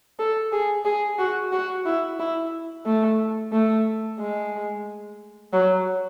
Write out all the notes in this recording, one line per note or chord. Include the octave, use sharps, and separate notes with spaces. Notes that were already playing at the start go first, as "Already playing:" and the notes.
A4
G#4
G#4
F#4
F#4
E4
E4
A3
A3
G#3
F#3